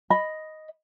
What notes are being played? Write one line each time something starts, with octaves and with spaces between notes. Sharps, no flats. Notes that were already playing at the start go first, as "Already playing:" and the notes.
D#5 B5